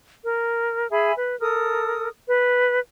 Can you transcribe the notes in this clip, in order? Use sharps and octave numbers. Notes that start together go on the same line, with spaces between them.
A#4
G#4 E5 G#5 B5
B4
A4 A#4 D#6
B4